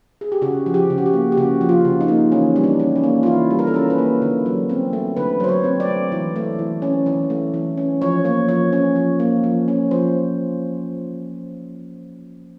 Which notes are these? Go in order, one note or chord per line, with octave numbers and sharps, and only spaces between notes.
G#4
G4
C#3 F#4
F3
G4
C#3
F#4
G4
A#3
G4
C#3 F#4
F3
F4
C#3
D#4
A#3
E3 C#4
G3
D4
C#4
C#4
A#3
F4
E3 E4
G3
A#4
A4
C#4 A#4
B4
A#3
D3
F#3
C4
A3
D3 B4
F#3 C5
C#5
C4
D5
A3
E3
A3
E3
C#4
E3
A3
E3
C#4
F3 C#5
A#3 C#5
F3 C#5
C#4
F3
A#3
F3
C#4
F3 C5